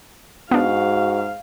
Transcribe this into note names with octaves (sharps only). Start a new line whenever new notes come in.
G#2 B3 D4 F#4 F5